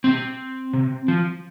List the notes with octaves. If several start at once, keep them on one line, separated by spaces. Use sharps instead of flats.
B2 C4
C3
F3